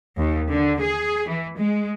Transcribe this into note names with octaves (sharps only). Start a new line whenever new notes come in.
D#2
D3
G#4
E3
G#3